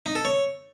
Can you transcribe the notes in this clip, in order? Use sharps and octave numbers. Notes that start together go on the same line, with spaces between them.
D#4
A4
C#5